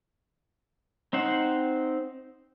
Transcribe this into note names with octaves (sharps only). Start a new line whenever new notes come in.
C4 D#4 C5 F#5